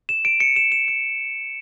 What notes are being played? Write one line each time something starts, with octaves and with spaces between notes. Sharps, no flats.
E7
D7
C#7
E7
E7
D7